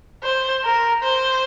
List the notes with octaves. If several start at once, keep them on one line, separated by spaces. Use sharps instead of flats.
C5
A#4
C5